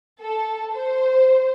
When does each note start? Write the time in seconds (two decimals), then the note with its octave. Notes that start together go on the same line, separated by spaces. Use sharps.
0.21 A4
0.73 C5